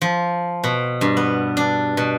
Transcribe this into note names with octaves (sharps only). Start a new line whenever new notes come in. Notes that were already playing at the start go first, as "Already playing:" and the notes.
F3
B2
G2
B3
D4
B2